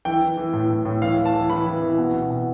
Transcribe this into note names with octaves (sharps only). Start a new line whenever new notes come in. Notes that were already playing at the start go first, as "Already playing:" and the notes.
E3 G5
E3
E3
A2
A2
A2
E3 F5
E3
A5
E3
E3 B5
E3
E3
B2
B2
B2